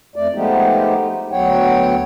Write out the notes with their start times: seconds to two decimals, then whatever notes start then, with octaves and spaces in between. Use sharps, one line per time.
0.16 F2 A3 D5
0.35 F3 G#3 A3 B3 D#4 G4
1.32 D2 F#3 B3 C#5 F#5 G5